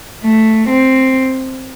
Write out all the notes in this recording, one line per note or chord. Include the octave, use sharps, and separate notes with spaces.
A3
C4